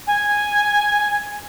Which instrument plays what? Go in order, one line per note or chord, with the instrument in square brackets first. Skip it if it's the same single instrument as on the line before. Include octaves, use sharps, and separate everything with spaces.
[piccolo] G#5